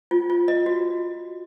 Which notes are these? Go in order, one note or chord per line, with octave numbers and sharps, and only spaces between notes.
F4
F4
D#5
F#4